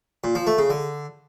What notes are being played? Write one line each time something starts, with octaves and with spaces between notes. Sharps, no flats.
A#2
F3
A3
C#3
D3